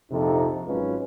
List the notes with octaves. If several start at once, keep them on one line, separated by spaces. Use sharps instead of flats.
A#1 F2 C3 F3 D#4 A4
G#1 F#3 G#3 C#4 F4 B4